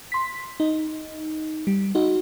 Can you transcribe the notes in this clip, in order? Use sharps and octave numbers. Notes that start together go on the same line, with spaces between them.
C6 B6
D#4
G3
D#4 F#4